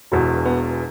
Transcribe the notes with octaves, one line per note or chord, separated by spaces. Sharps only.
E1 E2 B2 F#3
B3